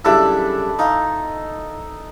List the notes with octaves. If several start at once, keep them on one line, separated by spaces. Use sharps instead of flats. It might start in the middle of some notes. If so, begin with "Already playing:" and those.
F#2 C#3 G3 D4 E4 A4
D#4 F4